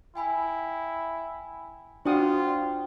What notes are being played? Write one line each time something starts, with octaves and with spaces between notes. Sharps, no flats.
E4 G5 G#5 B5
D4 F4 F#4 C5 G5 D#6 F#6